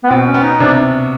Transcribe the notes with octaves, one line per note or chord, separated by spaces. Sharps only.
B3
B2 C4
C#4
B3
D#4
C3 D4